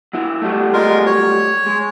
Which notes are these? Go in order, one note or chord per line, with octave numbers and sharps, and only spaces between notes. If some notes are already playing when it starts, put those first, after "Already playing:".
F#3 E4
F#3 G3 A3
G#3 F4 A#4
C#5
G#3